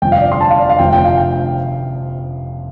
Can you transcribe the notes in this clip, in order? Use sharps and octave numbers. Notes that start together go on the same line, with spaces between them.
G1 F2 C3 G5
F5
D5
C6
A5
F5
D5
F5
F1 F2 C3 F3 G5
G5
F5
G5